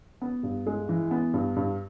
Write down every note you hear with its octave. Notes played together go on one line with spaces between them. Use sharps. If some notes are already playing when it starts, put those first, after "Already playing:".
B3
G2
G#3
E3
B3
G2
G2